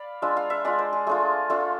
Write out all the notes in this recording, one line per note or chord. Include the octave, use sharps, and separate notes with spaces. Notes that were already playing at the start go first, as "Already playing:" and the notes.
Already playing: D5 F5 B5
G#3 D4 F4 E5
F5
E5
G#3 D4 F4 D5
C5
G#4
A3 D4 F4 G#4
A3 D4 F4 A4